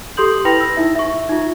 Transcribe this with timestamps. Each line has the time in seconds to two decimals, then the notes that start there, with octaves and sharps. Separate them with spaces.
0.17 G4 A4 C6 D#6 G6 F#7
0.45 E4 B4 G5 B5 A#6 F7
0.60 E6 A#6
0.77 D#4 E4 E5
0.95 E5 C#6
1.29 D#4 F4